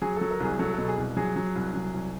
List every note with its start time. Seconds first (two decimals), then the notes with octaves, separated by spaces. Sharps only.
0.02 F#3 G#4
0.16 F#3 A4
0.31 A#4
0.40 C2 G#4
0.59 F#3 A4
0.73 B2 A4
0.88 G#4
0.98 C2
1.17 F#3 G#4
1.36 F#3
1.55 C2
1.74 F#3
1.94 C2